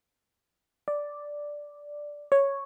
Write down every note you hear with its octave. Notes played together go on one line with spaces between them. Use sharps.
D5
C#5